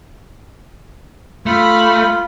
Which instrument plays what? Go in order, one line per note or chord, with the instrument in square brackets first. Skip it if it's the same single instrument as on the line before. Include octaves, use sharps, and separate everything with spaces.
[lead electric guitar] A3 [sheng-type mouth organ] F4 [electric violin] B5